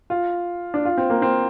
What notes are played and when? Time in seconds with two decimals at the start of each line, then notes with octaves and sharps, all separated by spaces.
0.10 F4
0.74 D4
0.85 F4
0.98 C4
1.10 A#3
1.22 C4